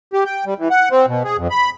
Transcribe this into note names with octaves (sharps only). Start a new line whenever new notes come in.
G4
G5
G3
E3
F#5
C4
B2
G#4
F2
B5